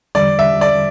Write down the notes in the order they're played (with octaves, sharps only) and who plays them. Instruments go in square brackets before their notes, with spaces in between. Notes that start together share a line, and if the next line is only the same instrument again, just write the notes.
[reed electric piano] E2 D3 G3 [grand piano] D5
[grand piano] E5
D5